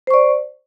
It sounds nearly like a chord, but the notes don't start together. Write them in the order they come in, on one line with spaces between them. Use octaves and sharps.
C5 C#6 D5